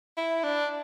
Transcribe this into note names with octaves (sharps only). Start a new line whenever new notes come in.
E4
D4